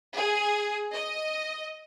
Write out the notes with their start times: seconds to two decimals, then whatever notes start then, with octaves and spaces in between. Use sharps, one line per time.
0.16 G#4
0.93 D#5